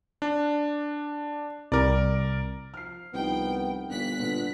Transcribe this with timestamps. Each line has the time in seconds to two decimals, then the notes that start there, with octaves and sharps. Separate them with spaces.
0.22 D4
1.72 C2 A#4 D5
2.74 F3 F6 C7
3.14 C2 F3 B3 D#4 G5
3.90 G1 A#2 F#6 B6
4.19 A#2 D3 B3